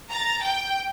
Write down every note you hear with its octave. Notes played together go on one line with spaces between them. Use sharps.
A#5 A6
G5